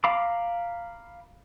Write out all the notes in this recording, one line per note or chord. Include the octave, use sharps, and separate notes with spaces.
F5 A#5 B5 D6